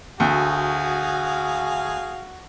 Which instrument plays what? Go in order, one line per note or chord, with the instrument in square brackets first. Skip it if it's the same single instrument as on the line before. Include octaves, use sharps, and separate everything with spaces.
[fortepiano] D2 [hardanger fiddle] F#4 [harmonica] G#4 F5